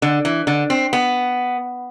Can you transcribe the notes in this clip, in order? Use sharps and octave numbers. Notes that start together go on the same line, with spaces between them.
D3
E3
D3
C4
B3